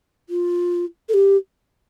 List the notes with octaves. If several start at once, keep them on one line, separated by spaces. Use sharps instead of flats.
F4
A4
G4